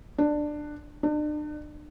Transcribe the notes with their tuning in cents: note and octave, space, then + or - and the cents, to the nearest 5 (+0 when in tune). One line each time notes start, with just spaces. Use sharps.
D4 +15
D4 +40